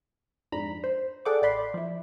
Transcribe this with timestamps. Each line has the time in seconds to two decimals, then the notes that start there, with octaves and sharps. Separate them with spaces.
0.52 F2 G#2 D4 A#5 B5
0.84 C5
1.25 G#4 A4 D5 F#5 G5 D6
1.42 A1 D5 B5 C6
1.74 F3 E4